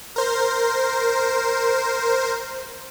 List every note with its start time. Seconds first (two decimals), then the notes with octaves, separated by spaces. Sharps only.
0.16 A#4 C5